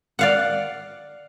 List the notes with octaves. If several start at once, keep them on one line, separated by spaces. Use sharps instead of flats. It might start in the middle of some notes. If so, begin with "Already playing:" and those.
D5 F5 F#5